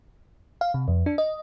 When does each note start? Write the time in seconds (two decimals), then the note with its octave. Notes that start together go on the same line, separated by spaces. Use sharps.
0.61 F5
0.74 C3
0.88 F2
1.06 D4
1.18 D#5